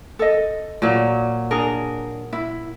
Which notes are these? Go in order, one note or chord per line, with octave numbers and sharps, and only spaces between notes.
A4 D#5
A#2 F#3
D4 G#4 A#4
E4